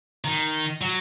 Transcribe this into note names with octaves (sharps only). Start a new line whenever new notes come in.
D#3
F#3